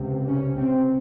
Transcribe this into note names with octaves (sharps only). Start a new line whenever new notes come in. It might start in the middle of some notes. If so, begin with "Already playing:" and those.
Already playing: C#2 C3
C#4
C4